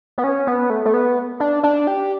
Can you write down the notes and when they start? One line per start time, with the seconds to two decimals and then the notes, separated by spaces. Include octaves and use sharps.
0.18 B3
0.24 C#4
0.47 B3
0.70 A3
0.85 A3
0.94 B3
1.40 D4
1.63 D4
1.87 G4